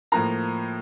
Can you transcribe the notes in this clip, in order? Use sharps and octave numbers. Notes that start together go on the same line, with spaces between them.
A2 F3 A#3 A#5